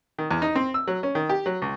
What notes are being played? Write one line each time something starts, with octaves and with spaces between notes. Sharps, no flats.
D#3
E2
D#4
C4
E6
F#3
C#4
D#3
G4
F#3
C#2